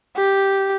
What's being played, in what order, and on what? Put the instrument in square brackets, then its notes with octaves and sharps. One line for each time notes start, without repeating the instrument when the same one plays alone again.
[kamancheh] G4